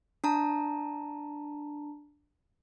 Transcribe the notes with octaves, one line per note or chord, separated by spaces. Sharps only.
D4 A5 A#5